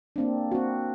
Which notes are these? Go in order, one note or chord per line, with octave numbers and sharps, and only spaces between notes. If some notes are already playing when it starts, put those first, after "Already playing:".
A#3 C4 D4
C4 F#4